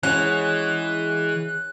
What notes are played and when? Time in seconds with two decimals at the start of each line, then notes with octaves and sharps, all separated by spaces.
0.03 E3 G#3 C#4 F#4 F#6